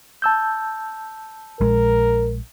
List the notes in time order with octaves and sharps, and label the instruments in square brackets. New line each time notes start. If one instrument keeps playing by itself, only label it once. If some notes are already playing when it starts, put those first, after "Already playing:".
[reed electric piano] A5 E6 G6
[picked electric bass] A#1 G#3 [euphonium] A#4